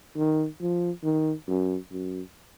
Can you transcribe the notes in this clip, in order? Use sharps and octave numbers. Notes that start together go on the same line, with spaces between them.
D#3
F3
D#3
F#2
F#2